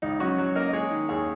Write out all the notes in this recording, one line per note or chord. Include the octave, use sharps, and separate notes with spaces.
C#2 D#4
F#3 C#4 F#4
F#3
A#3 A#4 D#5
D#5
G#3 G#4 C#5
D#3
D#2 G#4 C#5